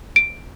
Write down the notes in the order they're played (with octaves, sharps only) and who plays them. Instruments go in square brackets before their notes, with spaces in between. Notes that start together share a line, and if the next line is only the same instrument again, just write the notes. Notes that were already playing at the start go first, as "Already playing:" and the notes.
[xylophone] D7